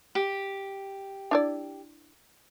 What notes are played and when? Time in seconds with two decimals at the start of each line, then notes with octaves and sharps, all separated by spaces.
0.15 G4
1.31 D4 E4 D5